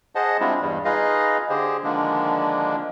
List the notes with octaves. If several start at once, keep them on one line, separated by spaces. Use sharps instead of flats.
G#4 C5 D#5 F#5 A5
G3 G#3 C4 D4 E4 F4
E2 G2 G3
D#4 F4 G#4 B4 D#5 F5
D3 G4 G#4 C5
D3 D#3 F3 G#3 A#3 D4